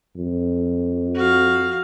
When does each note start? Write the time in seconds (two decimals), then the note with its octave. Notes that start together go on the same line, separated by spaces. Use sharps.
0.16 F2
1.15 F#4 F5